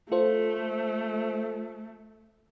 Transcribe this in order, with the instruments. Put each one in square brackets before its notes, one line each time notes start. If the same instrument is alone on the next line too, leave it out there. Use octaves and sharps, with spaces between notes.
[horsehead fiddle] A3 [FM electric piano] F4 A4 C5